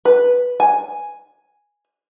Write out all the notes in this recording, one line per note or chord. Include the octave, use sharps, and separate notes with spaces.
B4
G#5